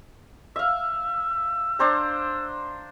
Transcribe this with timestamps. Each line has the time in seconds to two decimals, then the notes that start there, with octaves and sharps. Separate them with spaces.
0.56 E5 F5 E6
1.79 D4 C5 A#5